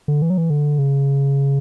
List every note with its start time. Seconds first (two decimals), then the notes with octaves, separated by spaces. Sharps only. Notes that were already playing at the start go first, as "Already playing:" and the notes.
0.08 D3
0.22 E3
0.30 F#3
0.38 E3
0.50 D3
0.79 C#3